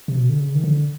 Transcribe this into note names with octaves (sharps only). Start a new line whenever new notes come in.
C3
B2
D3
C#3
D#3
D3